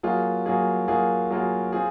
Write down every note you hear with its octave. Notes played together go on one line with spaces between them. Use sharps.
F#3 A#3 F4 G#4
F#3 A#3 F4 G#4
F#3 A#3 F4 G#4
F#3 A#3 F4 G#4
C4 F4 G#4